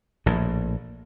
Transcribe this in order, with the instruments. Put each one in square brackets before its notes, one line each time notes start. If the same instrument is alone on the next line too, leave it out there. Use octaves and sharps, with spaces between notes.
[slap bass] A#1 A2